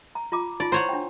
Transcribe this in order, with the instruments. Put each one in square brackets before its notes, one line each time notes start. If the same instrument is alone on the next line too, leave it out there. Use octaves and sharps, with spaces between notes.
[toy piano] A#5
F4 A#5 D6
[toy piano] D#4 F4 [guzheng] D5
[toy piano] E4 A#5 C6 [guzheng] C5 C#5 F#5
[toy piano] D4 G5